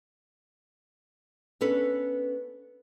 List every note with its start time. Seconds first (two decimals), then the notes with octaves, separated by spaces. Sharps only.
1.61 B3 C#4 D4 A4 B4